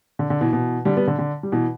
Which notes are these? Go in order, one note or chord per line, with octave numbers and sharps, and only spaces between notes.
D3
D3
B2 E3
B2 E3
D3 G3
G3 B3
D3
D3
G3
B2 E3